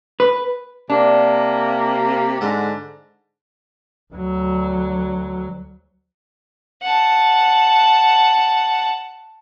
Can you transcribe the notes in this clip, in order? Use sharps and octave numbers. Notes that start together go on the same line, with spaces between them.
B4
C3 A#3 D4
G#2 D3
D2 F#3
F#5 A5